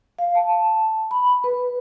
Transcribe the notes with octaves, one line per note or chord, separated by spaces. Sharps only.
F5
A5
B5
B4